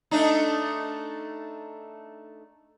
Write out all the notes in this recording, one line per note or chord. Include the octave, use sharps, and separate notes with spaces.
A3 D4 D#4